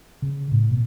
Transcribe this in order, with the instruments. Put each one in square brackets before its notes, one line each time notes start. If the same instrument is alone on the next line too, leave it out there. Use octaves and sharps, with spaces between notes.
[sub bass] C#3
A2
B2